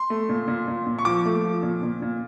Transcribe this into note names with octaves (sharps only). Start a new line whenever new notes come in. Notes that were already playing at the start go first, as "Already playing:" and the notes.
Already playing: C6
A3
A#2
A#2
A#2
A#2
C#6
F3 D6
A3
F3
A#2
A#2
A#2